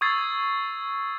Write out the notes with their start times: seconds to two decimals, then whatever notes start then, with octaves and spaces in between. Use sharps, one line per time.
0.01 C#6 D#6 E6 G#6 A6 C7